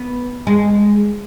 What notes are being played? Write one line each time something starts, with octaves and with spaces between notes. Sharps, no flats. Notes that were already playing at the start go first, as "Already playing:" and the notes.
Already playing: B3
G#3